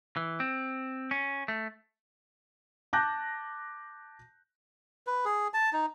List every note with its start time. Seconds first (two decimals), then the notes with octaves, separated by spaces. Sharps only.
0.17 E3
0.40 C4
1.11 C#4
1.48 A3
2.93 A5 D6 F#6 G6 A#6
5.07 B4
5.25 G#4
5.54 A5
5.73 D#4